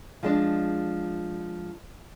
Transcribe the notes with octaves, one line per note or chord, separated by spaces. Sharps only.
F3 G#3 D4